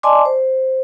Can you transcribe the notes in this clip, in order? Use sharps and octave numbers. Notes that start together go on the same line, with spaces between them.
D5 D#5 G#5 A5 C6 D6
C5